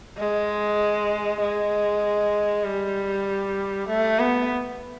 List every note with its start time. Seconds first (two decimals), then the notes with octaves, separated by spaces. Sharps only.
0.17 G#3
1.41 G#3
2.64 G3
3.89 A3
4.19 B3